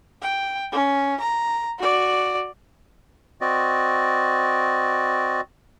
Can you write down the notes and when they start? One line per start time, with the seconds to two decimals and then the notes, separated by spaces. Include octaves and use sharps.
0.22 G5
0.72 C#4
1.21 A#5
1.79 F#4 D5
3.41 C4 F#4 D5 D#5